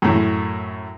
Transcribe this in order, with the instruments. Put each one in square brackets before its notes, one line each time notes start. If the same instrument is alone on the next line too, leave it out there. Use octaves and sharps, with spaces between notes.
[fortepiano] F#2 A2